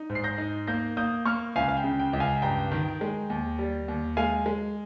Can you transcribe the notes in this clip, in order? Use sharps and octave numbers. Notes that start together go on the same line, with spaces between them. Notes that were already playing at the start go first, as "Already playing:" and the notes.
Already playing: D#4
G#2
C7
G6 A#6
D#4
A#3 G6 A#6
A#3 D#6 G6
A#3 C#6 F6
C#2 F5 G#5
F5
G5
C#3
G5
C#2
F5 G#5
G2 G5 A#5
D#3
G#3
D#2
G3
D#2
G#3 F5 G#5
G#3